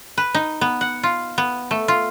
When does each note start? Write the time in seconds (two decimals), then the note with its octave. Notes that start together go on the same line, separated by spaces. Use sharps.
0.18 B4
0.34 D#4
0.61 B3
0.81 F#5
1.03 F4
1.38 B3
1.71 A3
1.88 F4